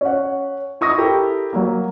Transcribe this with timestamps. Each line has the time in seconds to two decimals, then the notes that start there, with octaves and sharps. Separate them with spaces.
0.01 C#4 F#5
0.81 E4 C#6 D#6 A#6
0.98 E4 G4 A4 A#4
1.53 F#3 A#3